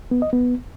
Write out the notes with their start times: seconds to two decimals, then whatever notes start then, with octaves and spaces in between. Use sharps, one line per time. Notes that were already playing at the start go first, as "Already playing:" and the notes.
0.11 B3
0.22 D#5
0.33 B3